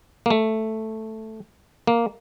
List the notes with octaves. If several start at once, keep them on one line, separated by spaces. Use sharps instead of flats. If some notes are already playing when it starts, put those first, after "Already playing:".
A#3
A3
A#3